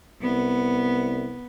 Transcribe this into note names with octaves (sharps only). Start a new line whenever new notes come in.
C2 B3